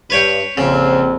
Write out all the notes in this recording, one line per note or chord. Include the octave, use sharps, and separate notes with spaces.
G2 B4 C#5 G5
A#1 F2 C#3 C4